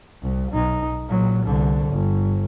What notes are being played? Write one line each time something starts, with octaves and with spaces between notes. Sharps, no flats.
C2
B1 D#4
A#2 F#3
C2 D3
G1